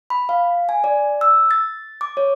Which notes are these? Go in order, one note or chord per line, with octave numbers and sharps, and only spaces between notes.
B5
F5
G#5
D5
E6
A6
D6
C#5